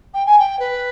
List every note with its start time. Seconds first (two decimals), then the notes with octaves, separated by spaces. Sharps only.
0.14 G5
0.26 G#5
0.39 G5
0.59 B4